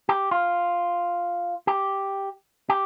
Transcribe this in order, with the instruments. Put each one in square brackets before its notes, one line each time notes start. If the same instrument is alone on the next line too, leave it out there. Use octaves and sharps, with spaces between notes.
[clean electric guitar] G4
F4
G4
G4